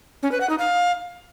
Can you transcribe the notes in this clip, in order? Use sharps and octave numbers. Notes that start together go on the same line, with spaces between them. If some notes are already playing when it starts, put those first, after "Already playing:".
C#4
B4
F#5
D#4
F5